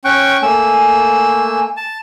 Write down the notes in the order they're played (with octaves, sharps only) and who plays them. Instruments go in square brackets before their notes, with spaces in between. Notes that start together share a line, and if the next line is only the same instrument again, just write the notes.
[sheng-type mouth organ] C#4 G5 C#6 [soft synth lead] F#6
[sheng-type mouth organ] A3 A#3 E6 [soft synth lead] G#5
[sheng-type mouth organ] A5